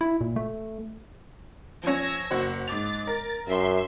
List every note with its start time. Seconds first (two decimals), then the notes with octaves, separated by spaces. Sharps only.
0.01 E4
0.21 A#2
0.36 A3
1.83 F3 C#4 E6 G#6 A#6
2.31 F#1 F#4 C5
2.68 G#2 D6 A6 F7
3.07 A#4
3.48 F#2 E5 C6